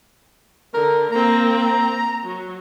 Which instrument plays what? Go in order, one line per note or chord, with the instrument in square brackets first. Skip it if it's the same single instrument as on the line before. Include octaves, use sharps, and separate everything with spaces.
[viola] D3 [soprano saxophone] A#4
[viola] A#3 C4 [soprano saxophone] A#5
[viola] F#3